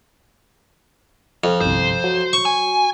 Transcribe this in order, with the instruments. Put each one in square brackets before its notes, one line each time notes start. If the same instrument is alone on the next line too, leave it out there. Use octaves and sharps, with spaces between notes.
[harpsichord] F2 [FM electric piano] F6
[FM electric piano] G1 C2 [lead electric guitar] C5
[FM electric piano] F#3
[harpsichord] C#6
[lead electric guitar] G#5